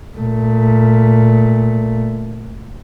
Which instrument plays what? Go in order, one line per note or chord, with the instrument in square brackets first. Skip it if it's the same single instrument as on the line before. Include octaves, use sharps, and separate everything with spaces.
[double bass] A#2 A3